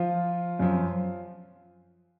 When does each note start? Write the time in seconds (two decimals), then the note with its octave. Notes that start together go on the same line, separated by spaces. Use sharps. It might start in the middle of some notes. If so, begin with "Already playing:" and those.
Already playing: F3 F4
0.59 F#2 F3